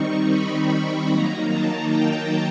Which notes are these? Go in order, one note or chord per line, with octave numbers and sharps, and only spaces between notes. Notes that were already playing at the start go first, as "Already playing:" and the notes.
Already playing: D#3 G3 C4 D#4 C#6
B5
D#3 F#3 A#3 D#4 A#5
A5
G5